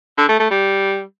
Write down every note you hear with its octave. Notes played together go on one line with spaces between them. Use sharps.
D3
A3
A3
G3